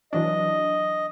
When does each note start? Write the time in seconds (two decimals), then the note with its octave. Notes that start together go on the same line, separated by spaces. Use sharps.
0.13 E3 F#3 D4 D#5